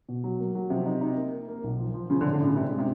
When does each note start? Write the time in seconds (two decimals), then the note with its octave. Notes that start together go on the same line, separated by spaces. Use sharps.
0.09 B2
0.24 F#3
0.40 A#3
0.55 F#3
0.70 C3 F3
0.86 D#4
1.01 D#4
1.17 A#3
1.32 A#3
1.48 A#3
1.64 B1
1.78 F3
1.94 F3
2.10 C#3 F3
2.21 D3
2.25 A2
2.33 D3
2.40 A2 C#3
2.56 G2 C3
2.71 G#3
2.79 C3